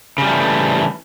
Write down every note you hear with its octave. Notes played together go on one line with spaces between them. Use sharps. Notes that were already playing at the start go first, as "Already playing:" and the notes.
C#3 E3 F3 G3 A3